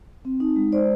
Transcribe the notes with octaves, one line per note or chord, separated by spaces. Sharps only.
C4
D#4
G#3
G#3 C5 D5